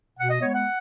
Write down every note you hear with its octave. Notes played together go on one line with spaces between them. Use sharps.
B2 F#5
D#5
G#3 B3 C#5
F#5